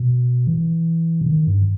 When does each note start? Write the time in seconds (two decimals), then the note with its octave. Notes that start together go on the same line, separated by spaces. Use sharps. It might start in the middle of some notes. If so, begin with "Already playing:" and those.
Already playing: B2
0.47 E3
1.21 C3
1.26 D#3
1.47 G2